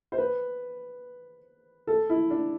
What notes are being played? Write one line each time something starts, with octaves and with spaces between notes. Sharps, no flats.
C5
B4
A4
E4
D4